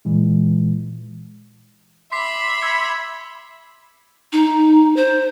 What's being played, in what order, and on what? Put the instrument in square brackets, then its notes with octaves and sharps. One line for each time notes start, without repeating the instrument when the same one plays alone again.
[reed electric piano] A#2 E3 G#3
[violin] E5 B5 [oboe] C6 [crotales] D6 B6 C7
[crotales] E6 G#6 C#7
[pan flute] D#4
C5